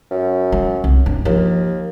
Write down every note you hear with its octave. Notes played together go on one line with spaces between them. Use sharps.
F#2
G3
C2
G2
D#2 F3